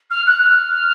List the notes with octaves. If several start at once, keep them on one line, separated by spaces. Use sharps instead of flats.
F6
F#6
F6